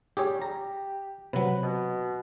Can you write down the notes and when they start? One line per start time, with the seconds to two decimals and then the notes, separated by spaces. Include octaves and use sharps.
0.17 G3 G4 G#4 C#5
0.42 G4 A#5
1.33 C3 F#3 B4
1.63 B2